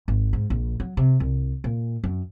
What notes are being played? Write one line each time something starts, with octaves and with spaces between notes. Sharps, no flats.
G#1
G#2
A#1
F#3
C3
C2
A#2
F#2